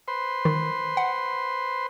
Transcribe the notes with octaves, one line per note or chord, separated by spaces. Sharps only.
B4 C5 C6
D#3
F#5